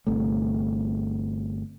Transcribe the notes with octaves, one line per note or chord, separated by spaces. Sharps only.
G1 C3 A3